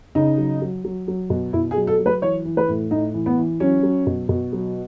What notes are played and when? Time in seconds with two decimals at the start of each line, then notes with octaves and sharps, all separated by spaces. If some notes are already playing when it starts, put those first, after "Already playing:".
0.15 C#3 D#4
0.38 F#3
0.62 F#3
0.85 F#3
1.08 F#3
1.30 B2
1.53 B2 E4
1.71 G#4
1.76 F#3
1.87 A4
1.99 F#3
2.06 B4
2.22 E3 C#5
2.45 E3
2.57 B4
2.68 A2
2.91 A2 D#4
3.14 E3
3.26 B3
3.38 E3
3.60 F#3 C#4
3.83 F#3
4.07 B2
4.29 B2
4.53 F#3